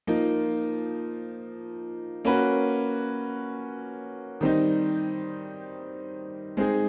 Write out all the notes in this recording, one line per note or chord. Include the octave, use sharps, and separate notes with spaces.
F3 A#3 D#4
A#3 C#4 F#4 B4
D#3 G3 C4 D#4
G#3 C4 D#4 G#4